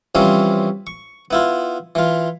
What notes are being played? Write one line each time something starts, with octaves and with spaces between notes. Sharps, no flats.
E3 F3 G3 C4 C#4
C#6
B3 E4 F4
E3 F4